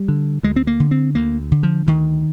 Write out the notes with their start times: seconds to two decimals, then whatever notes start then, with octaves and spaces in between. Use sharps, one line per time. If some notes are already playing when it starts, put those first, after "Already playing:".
Already playing: G3
0.08 D3
0.43 D2 G#3
0.56 C4
0.67 A#3
0.80 D3
0.91 C4
1.15 D2 A#3
1.52 D3
1.63 F3
1.87 D2 D#3